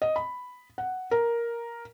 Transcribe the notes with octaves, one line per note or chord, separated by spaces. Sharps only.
D#5
B5
F#5
A#4